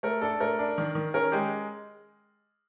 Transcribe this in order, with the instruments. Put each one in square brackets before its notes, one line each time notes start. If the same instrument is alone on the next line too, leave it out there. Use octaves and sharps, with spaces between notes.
[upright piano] A3 A#4
D4 A4
A3 A#4
D4
D#3
D#3
C#4 A#4
G#3 G4